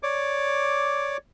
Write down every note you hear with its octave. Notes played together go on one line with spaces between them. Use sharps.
C#5 D5 D6